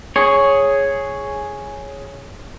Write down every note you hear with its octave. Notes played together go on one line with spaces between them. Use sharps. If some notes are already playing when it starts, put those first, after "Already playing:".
G#4 C#5